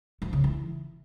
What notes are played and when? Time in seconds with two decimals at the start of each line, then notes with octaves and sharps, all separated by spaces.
0.22 F3
0.33 C#3
0.44 E3